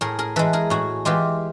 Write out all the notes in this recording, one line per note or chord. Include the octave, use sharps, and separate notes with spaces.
A2 G#4 A#4
G#4 A#4
E3 G#3 A4 B4
G#4 A#4
A2 F#4 G#4
E3 G#3 F4 G4